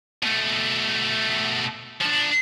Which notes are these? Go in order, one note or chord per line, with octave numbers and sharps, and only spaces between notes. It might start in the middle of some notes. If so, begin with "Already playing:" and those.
B2 A3
F3 D4